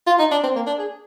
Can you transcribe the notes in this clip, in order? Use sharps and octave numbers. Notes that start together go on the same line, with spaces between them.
F4
D#4
D4
C4
A#3
D4
G#4